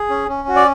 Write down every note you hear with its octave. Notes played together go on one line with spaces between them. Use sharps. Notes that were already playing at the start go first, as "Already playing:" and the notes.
Already playing: G#4
C#4
C#4
F#4
D5